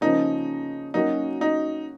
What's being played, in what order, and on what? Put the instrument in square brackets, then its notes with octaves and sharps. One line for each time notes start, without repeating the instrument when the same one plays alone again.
[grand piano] C#3 F3 A#3 C#4 [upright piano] D#4
[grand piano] F#3 A#3 C#4 F#4 [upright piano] D#4
[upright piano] D#4